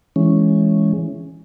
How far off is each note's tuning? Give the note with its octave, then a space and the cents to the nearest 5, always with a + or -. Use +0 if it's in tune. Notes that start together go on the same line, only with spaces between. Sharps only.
E3 +0 G#3 +0 C#4 +0